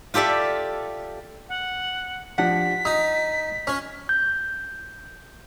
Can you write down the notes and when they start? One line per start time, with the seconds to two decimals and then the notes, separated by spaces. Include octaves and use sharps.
0.14 F4 G4 A4 D5 E5
1.49 F#5
2.38 F3 D4 G4 F#5 B6
2.85 D#4 D#6
3.67 C#4 F6
4.09 G6